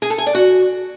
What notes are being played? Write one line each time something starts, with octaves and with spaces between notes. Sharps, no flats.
G#4
A4
G#5
D5
F#4